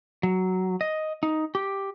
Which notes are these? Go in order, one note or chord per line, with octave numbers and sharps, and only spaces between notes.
F#3
D#5
D#4
G4